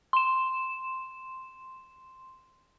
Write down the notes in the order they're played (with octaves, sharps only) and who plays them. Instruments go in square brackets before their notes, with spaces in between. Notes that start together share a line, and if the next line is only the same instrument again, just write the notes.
[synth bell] C6 E7